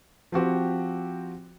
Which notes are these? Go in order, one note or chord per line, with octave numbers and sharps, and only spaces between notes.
F3 C4 F#4 G4